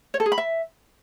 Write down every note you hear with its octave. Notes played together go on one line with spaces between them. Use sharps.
C#5
A4
G#4
B5
E5